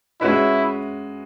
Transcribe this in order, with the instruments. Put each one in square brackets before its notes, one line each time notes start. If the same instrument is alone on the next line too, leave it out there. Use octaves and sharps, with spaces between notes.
[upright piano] G#3 C#4 F#4 B4 E5 [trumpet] E4